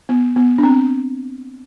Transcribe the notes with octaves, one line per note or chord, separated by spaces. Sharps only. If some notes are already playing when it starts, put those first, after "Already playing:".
B3
B3
D4
C4